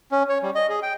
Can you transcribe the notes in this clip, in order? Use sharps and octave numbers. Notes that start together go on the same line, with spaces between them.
C#4
C#5
G3
D#5
G#4
G5